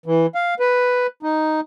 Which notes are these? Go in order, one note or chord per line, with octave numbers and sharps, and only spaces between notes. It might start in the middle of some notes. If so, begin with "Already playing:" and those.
E3
F5
B4
D#4